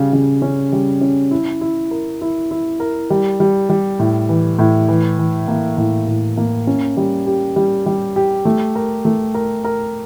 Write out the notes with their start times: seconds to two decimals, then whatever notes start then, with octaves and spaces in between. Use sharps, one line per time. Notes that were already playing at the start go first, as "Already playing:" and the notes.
Already playing: C#3 G3
0.13 C#3
0.42 C#4
0.73 G3
1.01 C#4
1.31 E4
1.61 E4
1.91 A#4
2.21 E4
2.51 E4
2.80 A#4
3.10 G3
3.40 G3
3.70 G3
3.99 A2
4.29 E3
4.59 A2
4.89 E3
5.19 E3
5.48 A#3
5.78 A2
6.08 A2
6.37 A#3
6.67 C#4
6.97 G3
7.27 G4
7.56 G3
7.86 G3
8.16 G4
8.45 A3
8.75 A#4
9.05 A3
9.34 A#4
9.64 A#4